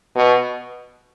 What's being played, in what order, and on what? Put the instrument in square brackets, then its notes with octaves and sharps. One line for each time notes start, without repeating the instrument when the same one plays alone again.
[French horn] B2